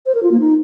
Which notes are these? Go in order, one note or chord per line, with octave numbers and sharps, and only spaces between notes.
C5
A#4
F4
A#3
D#4